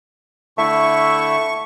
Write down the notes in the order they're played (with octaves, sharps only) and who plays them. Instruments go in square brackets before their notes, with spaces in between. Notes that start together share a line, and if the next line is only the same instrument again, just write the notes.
[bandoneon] D3 E4 E5 [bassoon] A3 [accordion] C#6